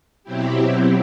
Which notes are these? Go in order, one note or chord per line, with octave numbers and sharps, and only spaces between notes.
B2 F#3 C4 E4 G4